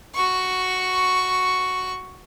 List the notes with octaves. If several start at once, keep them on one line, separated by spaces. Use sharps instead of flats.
F#4 C#6